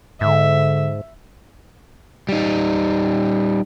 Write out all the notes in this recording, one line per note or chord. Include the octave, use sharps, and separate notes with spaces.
G#2 D3 E5
G3 D#4